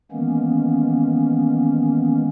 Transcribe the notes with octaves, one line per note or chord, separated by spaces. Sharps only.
D#3 E3 G#3 A#3 B3 C#4